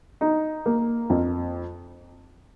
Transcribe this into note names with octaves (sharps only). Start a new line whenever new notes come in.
D#4
A#3
F2